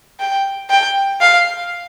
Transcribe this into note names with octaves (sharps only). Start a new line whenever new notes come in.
G5
G5
F5